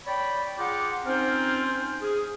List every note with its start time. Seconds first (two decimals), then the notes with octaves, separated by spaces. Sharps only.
0.05 C#5 D5 G5 B5
0.58 F4 G#4 F#5 G5 A#5 D6
1.06 C4 C#4 D#4 F4 A#4 C5
2.01 G#4